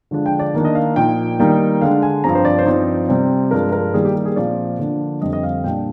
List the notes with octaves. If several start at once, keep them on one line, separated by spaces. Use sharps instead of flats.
D3 F3 G#3 D4
G5
D5
D#3 A#3 D4
D#5
F5
A#2 F3 A#3 D#4 G5
D#3 G3 A#3 D#4
D3 G#3 D4 F5
G#5
G2 F3 C4 A#5
C5
D5
C5
G2 F3 C4 D#4 D5
C3 G3 C4
G2 F3 G#3 D4 A#4
A#4
D#3 G3 A#3 G#4
G4
G4
G#4
A#2 F3 C4 D5
D3 F3 A#3 D4
F2 D3 G3 C4 D#5
D#5
F5
A#2 G3 D4 G5